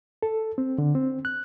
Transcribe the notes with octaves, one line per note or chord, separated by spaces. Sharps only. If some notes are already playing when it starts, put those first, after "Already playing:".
A4
C4
D3
C4
F#6